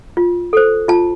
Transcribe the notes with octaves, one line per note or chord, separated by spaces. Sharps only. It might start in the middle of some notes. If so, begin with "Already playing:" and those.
F4
A4 C5
F4 A5